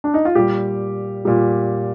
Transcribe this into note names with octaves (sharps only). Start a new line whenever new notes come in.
D4
D#4
F4
A#2 G3 G4
A#2 G3